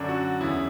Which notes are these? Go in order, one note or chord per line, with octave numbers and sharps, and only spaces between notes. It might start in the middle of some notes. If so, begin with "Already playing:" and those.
Already playing: F#2 D3 D4
F#4
E2 C#3 E3 E4